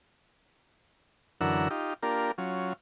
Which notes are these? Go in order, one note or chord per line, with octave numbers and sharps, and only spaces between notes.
F#2 D3 E3 A#4 F#5 E6
D#4 F4 G4
A#3 D4 F4 G4 A#4
F#3 C#4 F4